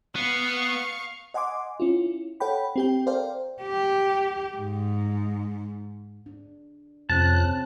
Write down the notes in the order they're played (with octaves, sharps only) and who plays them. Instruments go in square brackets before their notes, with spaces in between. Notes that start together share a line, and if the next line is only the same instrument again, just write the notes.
[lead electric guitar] B3 [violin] F5 C#6
[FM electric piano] D#5 F#5 G#5 C6 D6
C#4 E4 F4
A4 C#5 F#5 G5 B5
C4 G4 G5
A4 A#4 C5 D5 F5 G5
[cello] G4
G#2
[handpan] D4
[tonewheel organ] F2 F#6 [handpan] C3 C4 C#4 [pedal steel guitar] A5